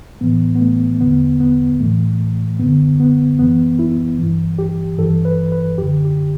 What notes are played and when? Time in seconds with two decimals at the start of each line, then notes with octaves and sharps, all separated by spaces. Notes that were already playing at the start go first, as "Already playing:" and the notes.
0.21 A2 E3 B3
0.55 B3
0.60 A3
1.01 E2 D3 B3
1.40 B3
1.80 A2 E3 A3
2.59 F#2 D3 B3
3.00 B3
3.39 F#2 E3 B3
3.79 E4
4.19 G2 E3
4.59 G4
4.98 G2 E3 A4
5.25 B4
5.52 B4
5.78 F#2 D3 G4
6.05 G4